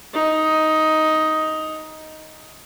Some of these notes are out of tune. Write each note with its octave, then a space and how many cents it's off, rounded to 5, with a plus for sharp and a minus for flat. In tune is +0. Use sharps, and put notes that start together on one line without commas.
D#4 +10